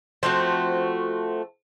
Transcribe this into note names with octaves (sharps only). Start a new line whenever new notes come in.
F3 A3 C4 F#4